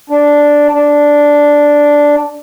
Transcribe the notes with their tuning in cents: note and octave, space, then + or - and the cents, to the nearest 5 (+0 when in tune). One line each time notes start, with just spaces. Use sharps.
D4 -5
D4 -5